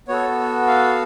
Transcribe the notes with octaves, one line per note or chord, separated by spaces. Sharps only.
B3 F#4 A4 C#5
F5